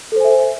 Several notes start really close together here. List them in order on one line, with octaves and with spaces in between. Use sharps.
A4 C5 G#5 E5